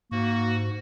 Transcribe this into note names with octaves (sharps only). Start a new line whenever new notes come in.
G#2 A#3 F#4